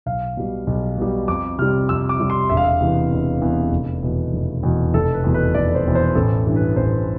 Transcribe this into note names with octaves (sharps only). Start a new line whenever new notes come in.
B1 F5
B2 G3
B1
B2 G3
F2 D6
C3 G3 F6
F2 E6
D6
C3 G3
C6
E1 E5
F5
E5
E2 C3 E3 B3
E1
E2 C3 E3 B3
F1
E2 B2
F1
E2 B2
F1 A4
B4
E2 B2
B4
F1 D5
C5
E2 B2
C5
A1 A4
G2 E3
B4
A1 C5